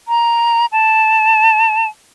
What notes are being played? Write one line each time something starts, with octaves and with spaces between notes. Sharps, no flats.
A#5
A5